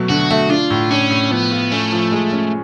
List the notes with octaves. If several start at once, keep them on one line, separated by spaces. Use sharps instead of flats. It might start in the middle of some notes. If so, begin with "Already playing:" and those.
Already playing: B2 F#3 A3
D3 F#4
A3
D4 F4
A2
C#4 D4
A2
F3 B3
F4
A3 C#4
F3
G#3
C#4